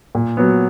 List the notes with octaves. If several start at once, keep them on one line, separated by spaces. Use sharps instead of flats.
A#2
F#3 B3